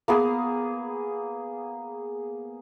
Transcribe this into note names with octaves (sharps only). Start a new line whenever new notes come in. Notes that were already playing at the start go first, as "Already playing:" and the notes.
A#3 B3 G#4